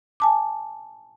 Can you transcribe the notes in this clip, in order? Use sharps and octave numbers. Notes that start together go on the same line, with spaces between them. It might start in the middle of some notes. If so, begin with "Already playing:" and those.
G#5 A5 D6